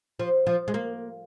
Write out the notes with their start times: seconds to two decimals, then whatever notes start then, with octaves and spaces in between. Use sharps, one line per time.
0.19 F3
0.47 F3
0.68 G#3
0.74 A#3